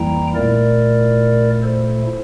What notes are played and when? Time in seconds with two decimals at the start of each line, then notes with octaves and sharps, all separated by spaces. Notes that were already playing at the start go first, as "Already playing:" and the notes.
Already playing: F2 E3 G3 A#3 E4 G5 A#5
0.35 A#2 A3 E4 A#4 D5
1.63 A4 C5